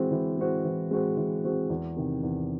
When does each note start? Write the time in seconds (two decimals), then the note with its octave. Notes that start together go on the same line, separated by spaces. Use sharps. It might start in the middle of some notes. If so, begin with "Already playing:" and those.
Already playing: E3 G#3 C4 F#4 C5
0.11 E3
0.38 G#3 C4 F#4 C5
0.64 E3
0.91 G#3 C4 F#4 C5
1.17 E3
1.44 G#3 C4 F#4 C5
1.70 E2
1.97 C3 D#3
2.23 E2